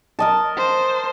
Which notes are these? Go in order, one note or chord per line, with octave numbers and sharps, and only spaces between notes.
A#4 D#5 A5
C5